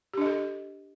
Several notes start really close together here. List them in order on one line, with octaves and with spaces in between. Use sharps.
G4 D4 D#5 A4